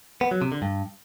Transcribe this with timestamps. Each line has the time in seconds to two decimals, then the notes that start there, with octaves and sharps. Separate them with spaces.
0.21 B3
0.31 F#3
0.42 C3
0.52 D3
0.62 G2